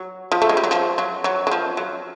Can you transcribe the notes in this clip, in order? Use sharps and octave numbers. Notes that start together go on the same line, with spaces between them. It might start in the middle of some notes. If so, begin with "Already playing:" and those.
Already playing: F#3
F3
A3
G#3
G3
F#3
F3
F#3
F#3
F#3
F3
F#3